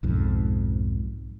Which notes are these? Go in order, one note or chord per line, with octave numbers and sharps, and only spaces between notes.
B1 F2 G#2